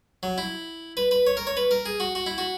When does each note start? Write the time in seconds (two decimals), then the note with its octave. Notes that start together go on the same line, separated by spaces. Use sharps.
0.23 F#3
0.38 E4
0.97 B4
1.11 B4
1.27 C#5
1.37 A#4
1.47 C#5
1.57 B4
1.71 A#4
1.86 G#4
2.00 F#4
2.15 F#4
2.26 E4
2.38 F#4